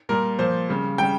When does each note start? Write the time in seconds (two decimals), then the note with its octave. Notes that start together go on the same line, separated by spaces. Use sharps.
0.09 A#2 G3 A#4
0.39 A#2 F3 C5
0.69 C#3 G3
0.98 C#3 G3 G5